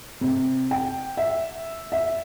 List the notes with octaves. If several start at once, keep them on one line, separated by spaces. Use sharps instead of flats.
C3
G5
E5
E5